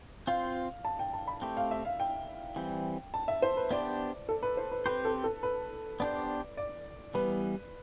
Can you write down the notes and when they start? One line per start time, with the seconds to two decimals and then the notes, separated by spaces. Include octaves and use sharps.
0.27 C4 F4 C5 F5
0.85 A5
0.99 G5
1.14 A5
1.27 B5
1.42 A3 C4 G4
1.57 F5
1.71 E5
1.85 F5
2.00 G5
2.56 E3 G3 C4
3.14 A5
3.28 E5
3.42 C5
3.57 B4
3.71 B3 D4 G4 C5 D5
4.29 A4
4.43 B4
4.57 C5
4.71 B4
4.86 C4 G4 B4 C5
5.05 A4
5.24 A4
5.43 B4
6.00 B3 D4 G4 C5 D5
6.57 D5
7.14 E3 G3 B3 B4